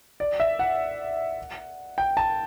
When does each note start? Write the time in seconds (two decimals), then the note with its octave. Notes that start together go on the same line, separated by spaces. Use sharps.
0.20 D5
0.40 E5
0.59 F#5
1.98 G5
2.17 A5